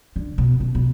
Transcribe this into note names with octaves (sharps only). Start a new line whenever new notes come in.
D3
B2
B2
B2